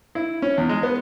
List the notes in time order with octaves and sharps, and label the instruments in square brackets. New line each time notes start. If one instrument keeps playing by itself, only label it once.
[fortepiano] E4
C#4
E2
G#3
B3